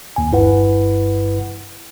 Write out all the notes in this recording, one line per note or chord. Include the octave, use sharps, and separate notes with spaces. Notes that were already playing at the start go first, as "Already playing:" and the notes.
D#2 G#5
G1 G2 E4 B4 F#5